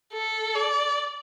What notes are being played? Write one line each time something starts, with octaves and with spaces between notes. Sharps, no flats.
A4
D5